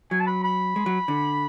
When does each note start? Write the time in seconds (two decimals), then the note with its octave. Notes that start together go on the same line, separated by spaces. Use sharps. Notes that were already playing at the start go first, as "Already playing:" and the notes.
0.11 F#3 G#5
0.20 A5
0.27 B5
0.44 B5
0.76 G#3
0.86 F#3
1.08 D3